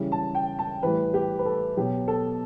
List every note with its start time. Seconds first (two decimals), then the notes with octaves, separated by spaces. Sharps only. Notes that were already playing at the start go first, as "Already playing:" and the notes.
Already playing: C#3 E3 G3
0.12 A5
0.35 G5
0.59 A5
0.83 A2 E3 G3 B4
1.14 G4
1.39 B4
1.45 A4
1.77 B2 F#3 G4
2.08 A4